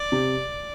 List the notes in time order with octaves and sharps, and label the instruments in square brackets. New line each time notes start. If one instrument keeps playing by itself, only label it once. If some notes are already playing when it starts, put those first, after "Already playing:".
Already playing: [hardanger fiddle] D5
[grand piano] C3